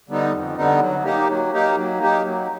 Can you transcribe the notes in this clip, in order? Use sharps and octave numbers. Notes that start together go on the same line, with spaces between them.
D3 G3 B3 D#4
F2
D3 G3 B3 D#4
F#3
A#3 D#4 G4
F#3
A#3 D#4 G4
F#3
A#3 D#4 G4
F#3